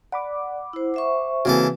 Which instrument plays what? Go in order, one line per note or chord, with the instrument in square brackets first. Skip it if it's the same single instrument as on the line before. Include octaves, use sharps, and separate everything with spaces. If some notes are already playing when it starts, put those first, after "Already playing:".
[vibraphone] D5 [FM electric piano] F#5 B5 D6
[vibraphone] E4 C5
C5 E5 C#6
[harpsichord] C#3 E3 A4 [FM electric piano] A#3 C4 F#4